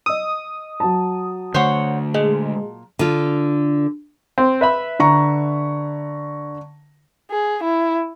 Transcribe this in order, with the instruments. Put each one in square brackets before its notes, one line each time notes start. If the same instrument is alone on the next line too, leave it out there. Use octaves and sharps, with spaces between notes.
[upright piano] D#5 E6 [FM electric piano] D#6
[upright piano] F#3 A5
[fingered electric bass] D3 A3 [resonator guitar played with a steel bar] C5 C#5 F#5
[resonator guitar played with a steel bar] A#2 [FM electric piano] G#3
[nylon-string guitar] D3 F4
[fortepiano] C4
B4 E5 B5
[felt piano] D3 A#5 C#6
[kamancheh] G#4
E4